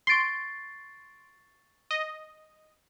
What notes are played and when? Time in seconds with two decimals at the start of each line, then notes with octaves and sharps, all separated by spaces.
0.07 C6 C#6 A6 C7 D7
1.91 D#5